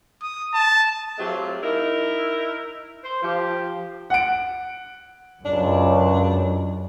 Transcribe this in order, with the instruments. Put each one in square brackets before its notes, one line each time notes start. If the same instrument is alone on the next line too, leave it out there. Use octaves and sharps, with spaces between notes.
[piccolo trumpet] D#6
A5
[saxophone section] F#3 A3 C4 F4 G4 G#4
D#4 E4 A#4
C5
F3 G4
[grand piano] F#5 D7
[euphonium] C#2 [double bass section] F#2 [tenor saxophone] D4